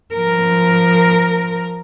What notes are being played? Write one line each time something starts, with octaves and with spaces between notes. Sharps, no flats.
F3 A#4